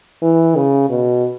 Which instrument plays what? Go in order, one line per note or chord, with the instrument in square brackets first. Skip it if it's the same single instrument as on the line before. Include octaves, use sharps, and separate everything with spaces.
[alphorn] E3
C#3
B2